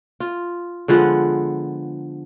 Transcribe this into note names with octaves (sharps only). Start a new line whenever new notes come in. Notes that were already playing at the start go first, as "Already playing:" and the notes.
F4
D3 F3 G#3 B3